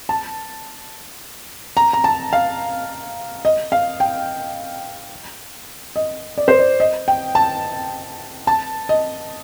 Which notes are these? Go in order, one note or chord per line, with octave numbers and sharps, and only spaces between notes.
A5
A#5
A#5
A5
F5
D#5
F5
G5
D#5
D5
C5
D5
D#5
G5
A5
A5
D#5